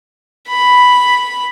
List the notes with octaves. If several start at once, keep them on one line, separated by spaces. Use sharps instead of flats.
B5